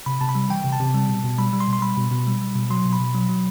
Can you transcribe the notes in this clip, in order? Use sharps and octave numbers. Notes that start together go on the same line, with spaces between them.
C3 B5
C3 A5
B5
G3
E3 G5
C3
A5
C3
G3
B2
B2
G3 B5
G3
C6
B2
C6
G3 B5
B2
B2
G3
G3
B2
F#3 C6
B2
B5
B2
F#3
F#3